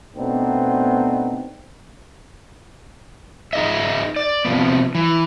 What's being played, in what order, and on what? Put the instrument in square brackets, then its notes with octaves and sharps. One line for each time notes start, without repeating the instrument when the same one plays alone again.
[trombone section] B2 A3 B3 C4 D4 D#4
[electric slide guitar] D#4 G#4 A4 D#5 E5
D5
C3 F3 B3
E3